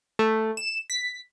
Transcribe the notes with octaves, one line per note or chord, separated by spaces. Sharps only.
A3
E7
B6